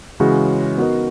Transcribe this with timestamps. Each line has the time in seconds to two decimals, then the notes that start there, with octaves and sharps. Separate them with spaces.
0.20 C#3 E3 G#3 C#4 F#4
0.78 B3 D#4 F#4 A#4 D#5